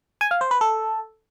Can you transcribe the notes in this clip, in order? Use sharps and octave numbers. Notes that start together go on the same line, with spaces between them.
G#5
F5
C5
B4
A4